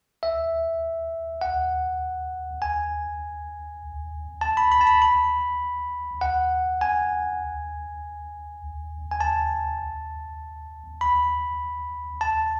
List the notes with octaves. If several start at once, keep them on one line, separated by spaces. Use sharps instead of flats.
E5
F#5
G#5
A5
B5
B5
A5
B5
B5
F#5
G#5
G#5
A5
B5
A5